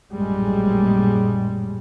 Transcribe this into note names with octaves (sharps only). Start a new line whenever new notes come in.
A1 F#2 A#2 G3 G#3